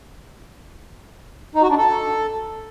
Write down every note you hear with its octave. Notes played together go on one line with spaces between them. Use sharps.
D#4
F#4
D4
A4